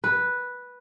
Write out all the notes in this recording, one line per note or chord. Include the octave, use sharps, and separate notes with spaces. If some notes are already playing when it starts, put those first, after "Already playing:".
B4